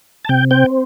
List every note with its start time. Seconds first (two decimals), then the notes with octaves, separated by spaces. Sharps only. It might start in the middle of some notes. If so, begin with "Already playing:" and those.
0.25 A5
0.29 C3 G5
0.51 C4 G5